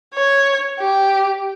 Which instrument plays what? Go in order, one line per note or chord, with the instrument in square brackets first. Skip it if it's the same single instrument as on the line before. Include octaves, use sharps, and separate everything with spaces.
[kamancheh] C#5
G4